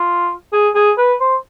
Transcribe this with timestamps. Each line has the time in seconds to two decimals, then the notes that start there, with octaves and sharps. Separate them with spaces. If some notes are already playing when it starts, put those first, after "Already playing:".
Already playing: F4
0.53 G#4
0.75 G#4
0.98 B4
1.20 C5